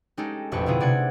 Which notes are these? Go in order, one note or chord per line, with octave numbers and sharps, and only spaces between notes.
G#3 C#4 D#4 G4 A4
E1 A1 F2 G4 B4 C#6
B2 D3 B3 E4 F4 G#4
C3 D5 F#5 G#6